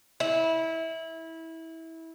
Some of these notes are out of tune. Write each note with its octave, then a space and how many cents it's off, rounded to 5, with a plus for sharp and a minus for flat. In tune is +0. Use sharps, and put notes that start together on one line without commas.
E4 -20